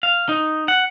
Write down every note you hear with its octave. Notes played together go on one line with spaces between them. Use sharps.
F5
D#4
F#5